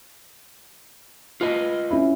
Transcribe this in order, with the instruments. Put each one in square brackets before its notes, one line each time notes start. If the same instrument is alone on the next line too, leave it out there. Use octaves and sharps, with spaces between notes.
[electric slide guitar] F4 B4 D#5
[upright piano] C#4 E4